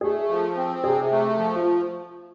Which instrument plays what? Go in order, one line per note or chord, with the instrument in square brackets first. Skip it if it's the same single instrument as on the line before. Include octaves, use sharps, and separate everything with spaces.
[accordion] A3 [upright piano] G#4
[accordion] F3
C4
[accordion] C3 [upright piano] G#4
[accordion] A3
F3
[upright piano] F4